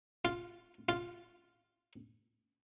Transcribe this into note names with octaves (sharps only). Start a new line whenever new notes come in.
F4
F4